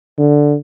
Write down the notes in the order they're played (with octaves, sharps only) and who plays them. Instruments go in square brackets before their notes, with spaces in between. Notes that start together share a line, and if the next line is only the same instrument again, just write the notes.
[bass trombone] D3